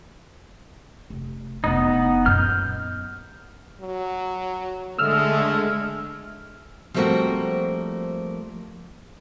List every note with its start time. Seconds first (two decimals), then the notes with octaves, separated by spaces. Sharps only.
1.10 F1
1.64 F1 B3 D4 D#4
2.26 F#2 A#2 F6 G6
3.81 F#3
4.99 D3 G#3 A3 E6 F6
6.94 F3 G3 A3 A#3 C4 F#4